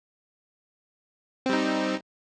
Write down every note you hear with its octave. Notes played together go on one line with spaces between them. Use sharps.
G3 C4 D#4